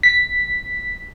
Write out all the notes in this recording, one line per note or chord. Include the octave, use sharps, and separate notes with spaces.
B6